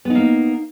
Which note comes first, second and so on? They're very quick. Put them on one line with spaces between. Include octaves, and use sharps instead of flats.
B3 D#4 A#3